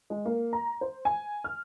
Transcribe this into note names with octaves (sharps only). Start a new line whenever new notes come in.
G#3
A#3
A#5
C5
G#5
F6